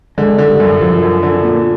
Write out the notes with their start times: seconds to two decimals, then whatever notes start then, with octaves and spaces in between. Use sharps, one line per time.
0.18 D3 G#3
0.38 D3
0.50 G3
0.60 F#2
0.81 F#2 F3
1.02 F#2
1.23 D3
1.44 A#2